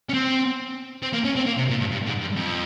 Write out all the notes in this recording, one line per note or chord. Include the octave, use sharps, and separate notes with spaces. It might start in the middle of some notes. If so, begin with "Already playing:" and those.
C#4
C4
C4
A#3
C#4
C4
A#3
C3
A#2
G2
G2
G#2
G2
F2